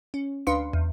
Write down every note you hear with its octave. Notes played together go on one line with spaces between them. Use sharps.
C#4
D2 D4 B4 F5 C6 C#7
E2